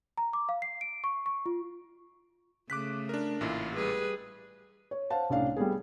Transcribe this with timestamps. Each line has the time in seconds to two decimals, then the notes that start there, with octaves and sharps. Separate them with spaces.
0.17 A#5
0.33 D6
0.49 F5
0.62 C7
0.81 D7
1.04 C#6
1.26 C#6
1.46 F4
2.70 C#3 A3 D6 F#6 B6
3.09 D4 A#4
3.41 A1 A#2 E4 F4
3.75 G3 G#4 B4
4.91 C#5
5.10 C5 F5 F#5 A5
5.30 C2 A2 C#4 D4 F5
5.56 G3 A3 B3 G#4